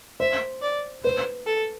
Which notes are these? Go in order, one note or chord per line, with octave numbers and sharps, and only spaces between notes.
C5 E5
D5
B4 C5
A4